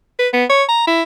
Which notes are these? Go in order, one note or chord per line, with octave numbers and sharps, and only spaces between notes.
B4
B3
C#5
A#5
E4